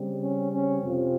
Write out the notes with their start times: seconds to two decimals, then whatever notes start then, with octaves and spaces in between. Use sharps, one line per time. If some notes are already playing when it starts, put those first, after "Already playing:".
Already playing: C#3 G3 C4
0.22 C#4
0.52 C#4
0.82 F2 C3 F3 C4